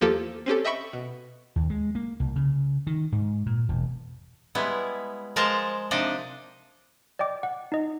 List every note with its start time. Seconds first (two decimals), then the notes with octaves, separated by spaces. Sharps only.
0.01 E2 F3 A#3 G4 A4
0.46 C4 C#4 G4 A4
0.65 D#5 E5 G5 B5 C#6
0.93 B2
1.56 D#2
1.70 G#3
1.95 A#3
2.20 C2
2.36 C#3
2.87 D#3
3.12 G#2
3.46 A#2
3.69 E1
4.55 G3 G#3 B3 E4
5.36 F3 G#3 A#4 C5 A5 A#5
5.91 C3 F3 D4 D#4 D5 D#5
7.19 D5 D#5 G5 D6
7.43 F#5
7.72 D#4 D#5